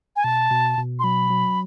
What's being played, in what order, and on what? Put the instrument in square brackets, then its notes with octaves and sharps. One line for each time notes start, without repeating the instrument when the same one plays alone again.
[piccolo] G#5
[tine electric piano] B2 [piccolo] A5
[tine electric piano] B2
B2
[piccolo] C6
[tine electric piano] F#3 [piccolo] B5
[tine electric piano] F#3